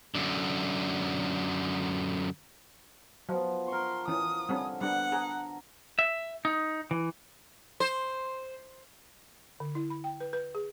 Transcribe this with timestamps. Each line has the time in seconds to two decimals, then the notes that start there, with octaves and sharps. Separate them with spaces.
0.15 F#2 D3
3.29 F3 F#3 B3
3.68 A#4 C6 C#6
4.08 E3 C#4 D#6
4.49 D3 G3 C4 C#4
4.81 G3 B3 D4 F#5
5.12 G#4 A#5
5.99 E5
6.45 D#4
6.91 E3
7.80 C5
9.60 D3
9.75 E4
9.90 B5
10.04 G5
10.21 B4
10.33 B4
10.55 G#4